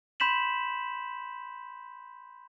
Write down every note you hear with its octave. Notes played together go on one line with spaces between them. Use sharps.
B5 C6 G6 B6 E7 F#7